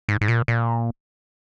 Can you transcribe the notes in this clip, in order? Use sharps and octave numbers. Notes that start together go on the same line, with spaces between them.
G#2
G#2
A#2
A#2